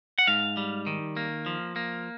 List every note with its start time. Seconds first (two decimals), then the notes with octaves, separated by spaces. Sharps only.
0.18 F#5
0.27 G#2 F5
0.57 G3
0.87 D#3
1.17 A#3
1.46 F3
1.76 A#3